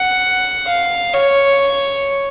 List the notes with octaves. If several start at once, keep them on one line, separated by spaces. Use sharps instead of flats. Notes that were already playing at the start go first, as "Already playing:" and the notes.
Already playing: F#5
F5
C#5